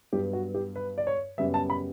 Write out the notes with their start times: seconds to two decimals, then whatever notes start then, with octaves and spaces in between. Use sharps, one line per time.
0.13 G2 F#3 B3 G4
0.33 F#4
0.54 G4
0.76 B4
0.98 D5
1.07 C#5
1.38 F#2 C#3 G3 B3 E5
1.54 A5
1.70 B5